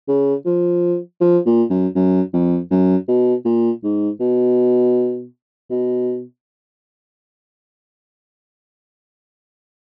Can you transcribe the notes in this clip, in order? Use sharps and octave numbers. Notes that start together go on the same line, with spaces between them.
C#3
F3
F3
A#2
F#2
F#2
F2
F#2
B2
A#2
G#2
B2
B2